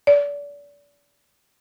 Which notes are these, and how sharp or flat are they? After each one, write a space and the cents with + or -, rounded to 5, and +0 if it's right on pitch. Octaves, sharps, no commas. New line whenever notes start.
D5 -35